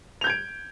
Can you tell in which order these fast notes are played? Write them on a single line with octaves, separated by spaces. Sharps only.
F7 G6 G#6 D7